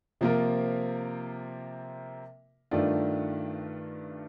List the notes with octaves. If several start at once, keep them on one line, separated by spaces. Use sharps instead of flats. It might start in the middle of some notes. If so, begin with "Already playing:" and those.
C3 F3 A#3 F4 A#4
G2 D#3 A3 D4 F4